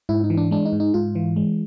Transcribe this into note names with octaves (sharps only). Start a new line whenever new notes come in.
G#2 E4
D#4
E3
D4
G#3 D4
D#4
G#2
D#4
G#2 F4
E3
G#3